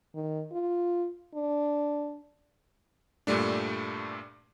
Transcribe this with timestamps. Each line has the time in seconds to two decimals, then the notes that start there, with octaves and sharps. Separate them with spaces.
0.15 D#3
0.52 F4
1.34 D4
3.27 G2 A#2 G3 A3 D4